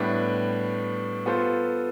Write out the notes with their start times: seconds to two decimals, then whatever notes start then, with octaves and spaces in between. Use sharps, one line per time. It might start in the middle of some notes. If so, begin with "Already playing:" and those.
Already playing: A2 G3 B3 D4 G4
1.26 B3 F4 A4 C5